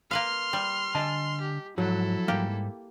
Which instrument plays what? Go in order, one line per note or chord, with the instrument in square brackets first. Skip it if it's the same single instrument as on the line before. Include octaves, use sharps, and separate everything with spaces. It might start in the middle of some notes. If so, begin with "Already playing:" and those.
[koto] A#3 B4 F5 [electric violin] C6 F6
[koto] G3
[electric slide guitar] D3 [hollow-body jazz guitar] D#5 G#5 A5
[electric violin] G4
[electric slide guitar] G#2 [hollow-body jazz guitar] F3 F#3 F#4 [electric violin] E4 A4
[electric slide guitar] G#2 C3 G3 [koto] A#3 G4